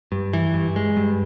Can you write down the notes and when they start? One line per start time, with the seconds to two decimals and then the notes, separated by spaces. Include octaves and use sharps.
0.12 G2
0.33 E3
0.54 G2
0.76 G#3
0.97 G2